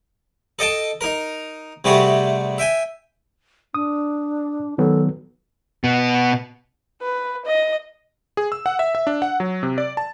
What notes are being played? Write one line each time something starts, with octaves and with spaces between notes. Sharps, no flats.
A4 D#5 G5 A5
D#4 A#4
C3 G3 A3 F#4 G#4
E5 G5 G#5
D4 D#6
D#3 F#3 B3 A4
B2 B3
B4
D#5
G#4
E6
F#5
E5
E5
D4
F#5
F#3
C3
D5
A5